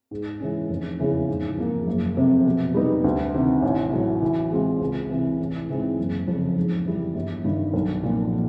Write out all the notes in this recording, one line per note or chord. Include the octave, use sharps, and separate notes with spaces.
G#2
E3 G#3 C#4
F1
E2 C#3 E3
G#2
F3 A#3
F#1
F2 C3
B2
G3 B3 D#4
D2
C3 D#3
A1
A2 F#3 A3
E3
G#3 C4 F4
C#2
C3 E3
A1
G#2 E3 G#3 C4
F#1
F2 C#3 F3
G#2
E3 G3
G1
G2 D#3
B1
A#2 F3